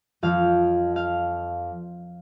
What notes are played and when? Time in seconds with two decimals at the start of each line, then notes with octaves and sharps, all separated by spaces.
0.23 F2 F3 F5
0.96 F5